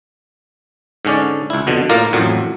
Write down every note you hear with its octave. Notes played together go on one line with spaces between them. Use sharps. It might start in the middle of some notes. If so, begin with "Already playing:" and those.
G#2 D3 C#4 D5
C#2 E4
F2 B2 D3
A2 A#3 F4 D5 F5 A#5
A1 F2 A2 F#3